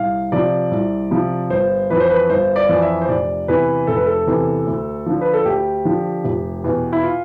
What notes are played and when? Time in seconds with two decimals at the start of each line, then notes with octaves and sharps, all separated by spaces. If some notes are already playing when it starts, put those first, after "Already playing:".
Already playing: C2 F5
0.32 C3 F3 D5
0.72 C2
1.11 C3 F3
1.50 G1 C5
1.90 F2 E3 B4
2.00 C5
2.09 B4
2.30 G1 C5
2.56 D5
2.69 F2 E3
2.82 E5
3.02 C5
3.09 F1 D5
3.48 E2 C3 E3 B4
3.87 F1 A4
3.96 B4
4.06 A4
4.27 E2 C3 E3
4.66 D2
5.06 D3 F3
5.21 B4
5.34 A4
5.45 D2 G4
5.85 D3 F3
6.24 F1
6.64 E2 B2
6.93 E4
7.03 F4